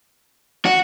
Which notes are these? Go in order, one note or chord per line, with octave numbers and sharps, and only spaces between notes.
F#4